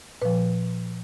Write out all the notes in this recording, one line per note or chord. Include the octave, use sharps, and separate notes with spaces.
A#2 F3 B4